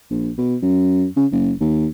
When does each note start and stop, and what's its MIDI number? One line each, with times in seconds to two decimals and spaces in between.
0.11 0.31 34
0.38 0.56 47
0.62 1.06 42
1.16 1.26 49
1.32 1.52 30
1.60 1.87 39